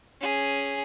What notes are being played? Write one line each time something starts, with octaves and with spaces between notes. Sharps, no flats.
C#4 G#4